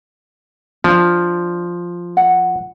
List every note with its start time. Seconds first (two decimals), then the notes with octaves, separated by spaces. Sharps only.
0.84 F3 C#4 D4
2.17 F#5